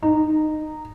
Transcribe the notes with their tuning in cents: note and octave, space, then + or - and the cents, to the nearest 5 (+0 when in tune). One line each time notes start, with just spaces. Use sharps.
D#4 -15